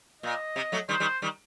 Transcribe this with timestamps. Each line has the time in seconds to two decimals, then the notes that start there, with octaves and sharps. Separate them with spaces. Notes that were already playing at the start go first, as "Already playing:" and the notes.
0.23 A#2 D#5
0.56 C3
0.72 F#3 A3
0.89 D#3 G3 C5
1.00 D#3 G3
1.22 D#3 G3